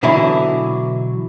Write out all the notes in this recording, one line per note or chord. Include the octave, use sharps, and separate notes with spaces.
B2 D3 E3 F#3 E4